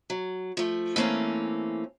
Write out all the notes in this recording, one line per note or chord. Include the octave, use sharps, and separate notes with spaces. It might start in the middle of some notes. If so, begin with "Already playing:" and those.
F#3
F3 A3
E3 A3 A#3 C4 C#4